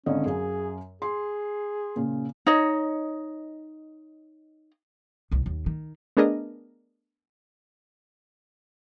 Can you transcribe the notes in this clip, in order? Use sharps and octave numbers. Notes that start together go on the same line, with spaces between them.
G#1 D3 C#4 D#5
F#2 G#4 F5
G#4 C6
A#2 C#3
D#4 C#5 D#5
G1 C2
D#2
D#3
A3 B3 D4 G#4 A#4 D#5